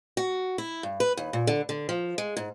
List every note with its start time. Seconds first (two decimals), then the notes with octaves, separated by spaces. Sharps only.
0.17 F#4
0.58 E4
0.83 G2
1.00 B4
1.17 D#2
1.33 A#2
1.47 D3
1.69 D3
1.89 F3
2.18 G#3
2.37 G#2